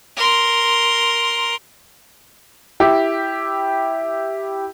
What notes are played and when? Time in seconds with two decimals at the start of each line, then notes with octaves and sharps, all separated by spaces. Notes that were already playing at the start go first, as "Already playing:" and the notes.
0.16 A#4 C6
2.80 E4 G4